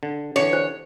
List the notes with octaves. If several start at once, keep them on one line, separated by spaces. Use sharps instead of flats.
D3
D3 E3 C#5
C5